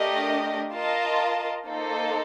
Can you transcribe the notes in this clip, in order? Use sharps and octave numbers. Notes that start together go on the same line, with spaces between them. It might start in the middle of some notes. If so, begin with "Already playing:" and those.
Already playing: A3 D4 G4 A#4 D#5
F4 A#4 D#5 A5
A#3 D#4 A4 C5